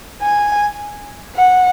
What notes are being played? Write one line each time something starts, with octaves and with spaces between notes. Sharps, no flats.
G#5
F#5